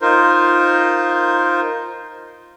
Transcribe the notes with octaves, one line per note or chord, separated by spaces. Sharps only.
D#4 F4 A#4 C5